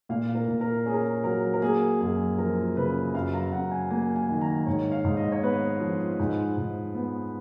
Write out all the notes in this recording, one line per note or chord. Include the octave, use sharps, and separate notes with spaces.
A#2 F5
A#4
A#2
A#4
C#4 G#4
A#4
G#4
F#3 A#4
A#4
A#3 G#4
F#2 G#4
F3 A#4
C#3 B4
F#2 F5
A#5
F#2 F#5
G#5
A#3 G#5
G#5
D#3
A#5
G#2 C#5
F5
G#2
D#5
C#5
B3 B4
F3
G#2
G#2
B3